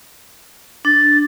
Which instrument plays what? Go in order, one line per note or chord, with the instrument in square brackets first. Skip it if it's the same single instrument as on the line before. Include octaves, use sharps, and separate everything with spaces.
[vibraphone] D4 [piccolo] A6